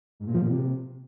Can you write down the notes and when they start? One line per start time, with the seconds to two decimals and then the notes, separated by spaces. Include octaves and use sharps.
0.20 G#2
0.27 A#2
0.35 F3
0.42 A#2
0.49 C3